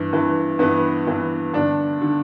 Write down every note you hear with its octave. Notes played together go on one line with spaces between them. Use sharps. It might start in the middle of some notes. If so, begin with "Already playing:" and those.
Already playing: G2 E3
G2 E3
G2 E3 B3
G2 E3
G2 D3 D4
D3